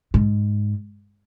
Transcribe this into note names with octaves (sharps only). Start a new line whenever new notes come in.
G#2